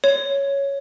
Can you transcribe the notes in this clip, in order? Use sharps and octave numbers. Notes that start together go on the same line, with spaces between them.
C#5